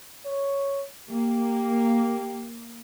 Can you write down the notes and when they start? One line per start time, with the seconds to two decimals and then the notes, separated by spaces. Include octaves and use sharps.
0.26 C#5
1.10 A#3 G4